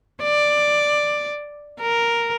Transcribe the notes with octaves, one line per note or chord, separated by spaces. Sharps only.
D5
A#4